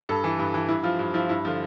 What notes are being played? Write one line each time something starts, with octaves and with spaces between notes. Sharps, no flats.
G2 A4
E3
G2
E3
G2 E4
F3 F4
G2
F3 E4
G2 E4
D3 F3 F4